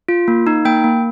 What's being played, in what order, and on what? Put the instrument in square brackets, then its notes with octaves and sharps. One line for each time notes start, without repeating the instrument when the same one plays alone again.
[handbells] F4
A#3
D#4
A#3 G5
A#3